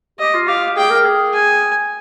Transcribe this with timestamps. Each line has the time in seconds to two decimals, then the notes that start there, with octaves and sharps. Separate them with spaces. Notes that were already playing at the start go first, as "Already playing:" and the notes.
0.19 G4 D#5
0.34 F4
0.48 G4 F5
0.76 G#4 G5
0.90 A#4
1.04 G#4
1.33 G#5